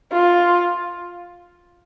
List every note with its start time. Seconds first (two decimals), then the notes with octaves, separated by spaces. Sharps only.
0.12 F4